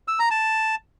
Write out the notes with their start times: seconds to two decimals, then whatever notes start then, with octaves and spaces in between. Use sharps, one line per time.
0.08 E6
0.19 A#5
0.31 A5